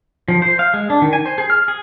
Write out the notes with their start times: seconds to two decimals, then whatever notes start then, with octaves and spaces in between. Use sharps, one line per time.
0.28 F3
0.42 C5
0.59 F5
0.74 G#3
0.90 D4
1.02 D#3
1.13 G#5
1.26 C5
1.38 G#4
1.50 F6
1.68 G#4